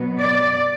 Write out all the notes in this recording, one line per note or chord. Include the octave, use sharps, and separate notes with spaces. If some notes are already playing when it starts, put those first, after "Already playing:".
Already playing: B2 F#3 B3
D5